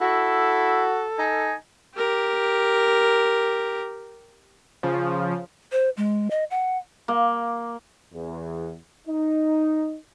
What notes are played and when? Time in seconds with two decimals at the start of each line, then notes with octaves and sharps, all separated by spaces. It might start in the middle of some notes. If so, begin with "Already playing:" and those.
0.01 E4 F#4 A4
1.19 D#4 G#5
1.96 G4 A#4
4.83 C#3 F3
5.72 C5
5.97 G#3
6.31 D#5
6.51 F#5
7.08 A#3
8.13 E2
9.08 D#4